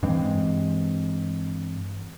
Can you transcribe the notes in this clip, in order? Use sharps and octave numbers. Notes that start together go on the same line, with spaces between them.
G2 E3 G#3 C4